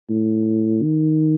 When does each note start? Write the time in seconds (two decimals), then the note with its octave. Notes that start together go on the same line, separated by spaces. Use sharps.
0.10 A2
0.82 D#3